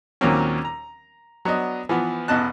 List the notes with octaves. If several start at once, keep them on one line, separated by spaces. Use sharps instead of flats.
D#2 A#2 F#3 A#3 C4 C#4
A#5
F#3 B3 D4 D#5
E3 F3 B3
A1 E2 B2 D#5 A5 F#6